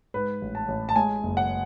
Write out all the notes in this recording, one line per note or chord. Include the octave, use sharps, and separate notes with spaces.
G#2 B4
A1
A5
A1
A5
G#3 G#5
F#1
F#5